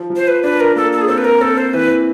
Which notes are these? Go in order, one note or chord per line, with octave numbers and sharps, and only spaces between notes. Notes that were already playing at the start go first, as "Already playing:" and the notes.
Already playing: F3
F3
C5
B4
D4 B4
A#4
A#3 A4
A4
G#4
C4 A4
B4
A#4
C4 A4
C5
E3 B4